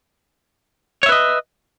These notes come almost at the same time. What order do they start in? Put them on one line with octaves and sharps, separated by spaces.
C#5 E5 B4 D#5